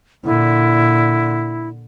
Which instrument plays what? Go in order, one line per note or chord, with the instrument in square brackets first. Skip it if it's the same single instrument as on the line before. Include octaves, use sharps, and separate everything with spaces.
[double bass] A#2 D3 [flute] E4